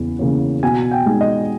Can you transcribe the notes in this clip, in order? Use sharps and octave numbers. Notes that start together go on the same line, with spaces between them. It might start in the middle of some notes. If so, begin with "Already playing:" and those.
Already playing: E2 C#3 E3
C#3 E3 A#3 C#4
B2 G#5
G5
G#3 D#4
D#5